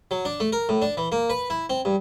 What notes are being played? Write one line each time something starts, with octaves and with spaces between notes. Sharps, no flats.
F#3
D4
A3
A#4
A2
D4
E3
A#3
B4
E4
C4
G2